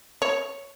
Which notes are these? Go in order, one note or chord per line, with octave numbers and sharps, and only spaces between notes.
C#5